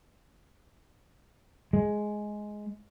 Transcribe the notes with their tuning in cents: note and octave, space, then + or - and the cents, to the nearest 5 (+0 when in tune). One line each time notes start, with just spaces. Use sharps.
G#3 +10